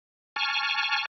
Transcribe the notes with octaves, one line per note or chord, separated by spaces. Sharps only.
G#5 A5 C#6 F6